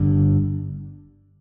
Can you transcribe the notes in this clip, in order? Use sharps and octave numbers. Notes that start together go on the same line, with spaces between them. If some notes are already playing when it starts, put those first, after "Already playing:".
Already playing: G1 G2 D3